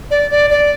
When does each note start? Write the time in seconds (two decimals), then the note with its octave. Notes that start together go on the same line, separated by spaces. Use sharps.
0.11 D5
0.31 D5
0.50 D5